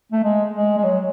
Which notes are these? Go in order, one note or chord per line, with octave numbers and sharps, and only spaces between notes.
A3
G#3
G#3
G#3
F#3